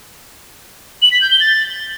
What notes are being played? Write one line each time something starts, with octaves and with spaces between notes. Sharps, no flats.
F#7
B6
G6
G7
A6